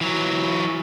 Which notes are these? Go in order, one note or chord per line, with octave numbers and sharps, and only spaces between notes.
E3 F#3